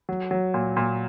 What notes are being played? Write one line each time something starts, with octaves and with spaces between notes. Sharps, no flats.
F#3
F#3
A#2
A#2